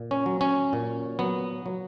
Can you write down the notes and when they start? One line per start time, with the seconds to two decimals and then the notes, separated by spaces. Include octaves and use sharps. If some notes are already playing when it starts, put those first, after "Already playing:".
Already playing: A#2
0.11 C#4
0.26 F#3
0.41 C#4
0.73 A#2
1.19 F#3 B3
1.66 F#3